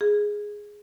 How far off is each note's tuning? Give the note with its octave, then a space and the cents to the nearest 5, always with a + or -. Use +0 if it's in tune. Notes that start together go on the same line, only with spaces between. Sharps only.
G#4 +0